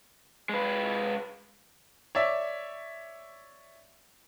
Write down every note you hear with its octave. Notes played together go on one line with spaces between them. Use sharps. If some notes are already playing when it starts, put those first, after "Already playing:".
G#3 B4
C#5 D5 E5